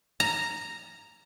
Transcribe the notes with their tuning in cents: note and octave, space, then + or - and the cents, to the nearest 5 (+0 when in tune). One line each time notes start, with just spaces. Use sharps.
A#5 -5